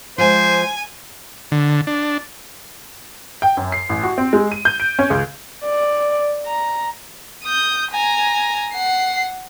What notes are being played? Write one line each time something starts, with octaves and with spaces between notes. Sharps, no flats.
F3 G#3 C5 G#5
D3
D4
G5
F#2
C7
A1
F#4
C4
G#3
D#7
G6
D7
C#4
C#2
D5
A#5
D#6 G6
G#5 A#5
F#5 C7